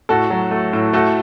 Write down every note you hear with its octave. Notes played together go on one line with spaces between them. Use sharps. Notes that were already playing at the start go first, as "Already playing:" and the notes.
A2 F#4 A4
F#3
A3
A2
A3 F#4 A4